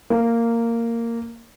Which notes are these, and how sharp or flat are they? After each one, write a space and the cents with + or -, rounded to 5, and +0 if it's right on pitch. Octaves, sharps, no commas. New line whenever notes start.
A#3 -10